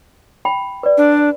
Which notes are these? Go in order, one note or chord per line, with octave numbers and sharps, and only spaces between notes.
G5 B5
B4 D5
D4